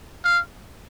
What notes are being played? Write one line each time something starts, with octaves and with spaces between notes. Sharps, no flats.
F5